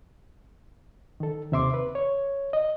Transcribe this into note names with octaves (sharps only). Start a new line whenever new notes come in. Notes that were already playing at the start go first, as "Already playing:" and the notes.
D#3 A4
D#2 C3 E5 C6 D6
B4
C#5
D#5